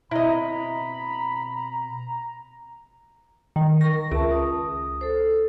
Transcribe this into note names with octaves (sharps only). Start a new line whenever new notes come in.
B2 C4 E4 D#5 A#5 B5
D#3
A#4 C#6 A#6
C#2 E5 A5
D#6
A4 C5